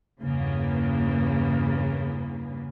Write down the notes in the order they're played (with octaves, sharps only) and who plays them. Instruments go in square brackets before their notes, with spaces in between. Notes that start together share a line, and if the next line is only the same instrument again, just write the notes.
[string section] E2 G2 C#3 A#3 B3